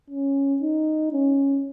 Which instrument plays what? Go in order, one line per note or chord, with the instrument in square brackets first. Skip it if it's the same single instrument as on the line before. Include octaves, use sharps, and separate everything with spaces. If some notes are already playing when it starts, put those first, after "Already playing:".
[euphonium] C#4
D#4
C#4